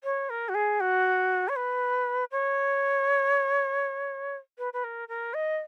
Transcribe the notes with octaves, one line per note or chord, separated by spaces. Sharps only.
C#5
A#4
F#4
G#4
F#4
C#5
B4
C#5
B4
B4
A#4
A#4
D#5